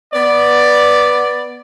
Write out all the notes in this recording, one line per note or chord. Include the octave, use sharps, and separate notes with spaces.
B3 D5